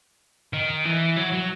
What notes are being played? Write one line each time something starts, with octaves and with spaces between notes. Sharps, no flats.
D#3
E3
F#3
F#3